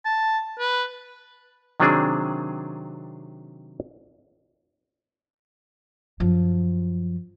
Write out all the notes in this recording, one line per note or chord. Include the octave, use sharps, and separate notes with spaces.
A5
B4
C3 D#3 F#3 C4 D4 G#4
F#2 F3